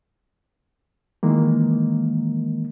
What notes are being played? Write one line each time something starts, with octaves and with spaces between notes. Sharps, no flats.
D#3 E3 G#3 A#3